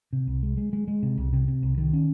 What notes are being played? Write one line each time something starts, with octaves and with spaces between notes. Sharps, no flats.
C3
C2
G#3
G#3
G#3
G#3
C3
C2
C3
C3
C2
D#3
C#4